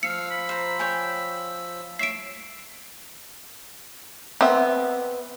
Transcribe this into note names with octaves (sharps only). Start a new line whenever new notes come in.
F3 F5 E6 C#7
B5
C5 A#5
C#5 G5 G#5
C#5 E5 C7 D7
B3 C4 E5